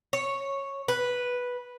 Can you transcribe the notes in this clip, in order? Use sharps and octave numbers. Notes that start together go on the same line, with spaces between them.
C#5
B4